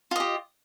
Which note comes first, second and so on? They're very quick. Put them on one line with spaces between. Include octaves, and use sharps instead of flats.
F4 D#5 G4